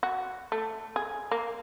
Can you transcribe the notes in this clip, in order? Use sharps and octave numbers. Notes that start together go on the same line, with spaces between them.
F#4
A3
G#4
A#3